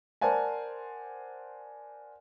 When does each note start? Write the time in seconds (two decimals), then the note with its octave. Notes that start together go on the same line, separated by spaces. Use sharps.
0.21 A#4 C5 D5 F#5 G#5 A5